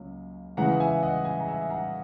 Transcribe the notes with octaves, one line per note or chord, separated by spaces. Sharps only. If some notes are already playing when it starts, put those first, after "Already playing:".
Already playing: C#2 C#3 F#3 A#3 C#4
C#3 E3 G#3 F#5 A#5
E5 G#5
D#5 F#5
E5 G#5
A#5
E5 G#5
F#5 A#5